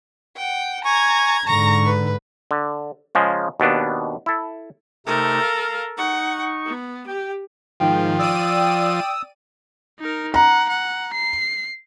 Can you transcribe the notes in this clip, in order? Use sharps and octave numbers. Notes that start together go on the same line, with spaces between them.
F#5 G5
G#5 A#5 C#6 G#6
G#2 D3 A#5 C#6 A#6
B4
D3
C#3 F3 G#3
D#2 B2 B3 D4
E4 A4
C3 A3 D#4 A4 A#4
F5
D#4 F#5 C#6
B3
G4 G5
G#2 D#3 F3 G5
D5 D#6 E6 D#7
D#4 A#4
F#5 A#5
F#5
C7